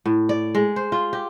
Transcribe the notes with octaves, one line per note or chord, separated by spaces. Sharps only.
A2
D5
G#3
C5
F4
G4